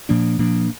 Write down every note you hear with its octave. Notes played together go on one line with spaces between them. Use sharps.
A#2 F3 A#3 D4
A#2 F3 A#3 D4